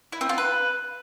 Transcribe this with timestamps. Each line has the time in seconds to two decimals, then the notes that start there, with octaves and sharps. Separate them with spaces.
0.12 E4
0.21 C4
0.29 F4
0.38 B4